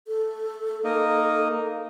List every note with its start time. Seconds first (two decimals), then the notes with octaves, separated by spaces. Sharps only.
0.08 A4
0.84 A#3 D#4